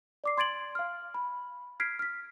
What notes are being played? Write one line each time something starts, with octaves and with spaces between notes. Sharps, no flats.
D5 D6 C7
C6 G#6 A6 D7 F#7
F5 F6
B5
F6 G#6 B6 C7 D7
F6 B6